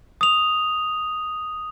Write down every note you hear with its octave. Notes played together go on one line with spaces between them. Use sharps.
D#6 F7